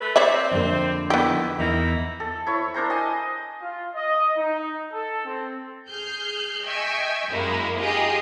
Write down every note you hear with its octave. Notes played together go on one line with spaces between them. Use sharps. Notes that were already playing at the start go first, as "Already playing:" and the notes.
A3 B4
C4 C#5 D5 E5
F2 D3 A#3
E2 D#3 B3 E4 G4
E2 A#3 D#4 E4
A4
E4 C#5 C#6
D4 A#4 C5 A#5
D#5 G#5 A5
F4
D#5
D#4
A4
C4
G#4 F6 G6
D#5 E5 G5 G#5 C#6
F#2 G#3 A#3 E4
D#4 F4 G4 G#4 D#5